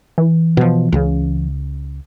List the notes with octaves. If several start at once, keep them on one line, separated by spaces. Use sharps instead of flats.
E3
B2 F3
C#2 C#3